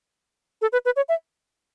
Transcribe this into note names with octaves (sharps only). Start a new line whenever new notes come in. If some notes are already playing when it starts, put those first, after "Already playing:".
A4
B4
B4
C#5
E5